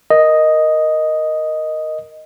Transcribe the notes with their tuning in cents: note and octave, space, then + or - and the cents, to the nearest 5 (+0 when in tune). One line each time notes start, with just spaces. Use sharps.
A#4 +5 D#5 +0